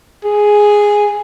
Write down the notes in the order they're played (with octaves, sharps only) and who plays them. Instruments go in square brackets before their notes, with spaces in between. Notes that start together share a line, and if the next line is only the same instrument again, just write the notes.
[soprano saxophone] G#4